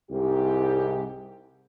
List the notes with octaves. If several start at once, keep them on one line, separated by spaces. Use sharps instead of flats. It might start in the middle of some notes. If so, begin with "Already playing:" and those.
C2 G#2 G4